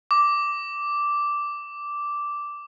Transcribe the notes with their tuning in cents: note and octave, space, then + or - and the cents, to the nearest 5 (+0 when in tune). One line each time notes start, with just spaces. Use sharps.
D6 -5